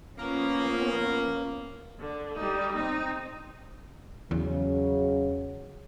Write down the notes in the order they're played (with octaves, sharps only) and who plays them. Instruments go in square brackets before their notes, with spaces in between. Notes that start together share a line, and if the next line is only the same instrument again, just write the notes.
[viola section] F3 B3 C#4 [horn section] A#3
[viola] D3
G3 D#4
C4 D#4
[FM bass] E2 [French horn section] C#3 F#3